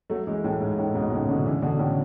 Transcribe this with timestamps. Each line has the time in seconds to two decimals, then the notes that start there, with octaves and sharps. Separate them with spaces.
0.10 F#3 A3
0.27 E3 G#3
0.44 A2
0.60 G#2
0.78 A2
0.95 G#2 B2
1.12 A2 C#3
1.29 B2 D3
1.46 C#3 E3
1.62 B2 D3
1.79 A2 C#3